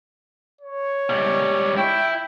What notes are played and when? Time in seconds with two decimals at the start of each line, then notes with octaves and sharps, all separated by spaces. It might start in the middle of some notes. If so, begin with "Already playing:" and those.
0.61 C#5
1.09 G#2 G3
1.77 E4 G5